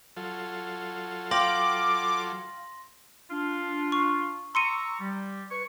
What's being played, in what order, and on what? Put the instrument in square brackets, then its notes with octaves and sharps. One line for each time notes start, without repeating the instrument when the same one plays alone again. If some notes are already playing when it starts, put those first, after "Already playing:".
[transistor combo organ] F#3 F4 A4
[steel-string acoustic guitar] F5 G5 [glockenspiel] C6 A#6 F#7 [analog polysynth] D6
[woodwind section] D4 F4
[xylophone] C#6
[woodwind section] A#5 C#6 E6 [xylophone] C6 C#7 D#7
[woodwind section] G3
B4 C#6